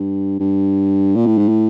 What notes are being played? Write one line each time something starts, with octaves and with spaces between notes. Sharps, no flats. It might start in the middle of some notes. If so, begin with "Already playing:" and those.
Already playing: G2
G2
A#2
A2
G#2
A2